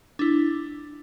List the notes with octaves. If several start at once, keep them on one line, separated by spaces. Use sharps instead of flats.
D4 E4